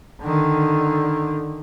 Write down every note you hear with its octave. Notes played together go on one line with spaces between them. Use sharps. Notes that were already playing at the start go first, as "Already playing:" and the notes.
D3 D#3